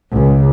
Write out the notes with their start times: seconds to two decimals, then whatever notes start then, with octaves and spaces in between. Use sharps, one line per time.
0.15 C#2